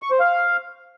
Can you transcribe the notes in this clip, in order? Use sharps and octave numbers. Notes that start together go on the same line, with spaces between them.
C#6
C5
F5